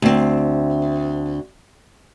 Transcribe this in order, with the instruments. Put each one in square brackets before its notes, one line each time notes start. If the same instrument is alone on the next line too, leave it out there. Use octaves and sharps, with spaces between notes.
[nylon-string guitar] D2 C4